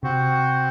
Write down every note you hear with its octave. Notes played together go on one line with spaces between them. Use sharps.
C3 C4 F#4 C5 F#5